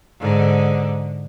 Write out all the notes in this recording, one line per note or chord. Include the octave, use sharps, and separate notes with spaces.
G#2 D3